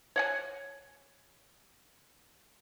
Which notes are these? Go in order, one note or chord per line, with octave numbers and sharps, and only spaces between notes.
C#5 F#5 G#5